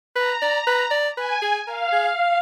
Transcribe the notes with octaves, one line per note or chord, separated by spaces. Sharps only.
B4 A#5
D5
B4
D5
B4 G#5
G#4
A#4 F5
G#4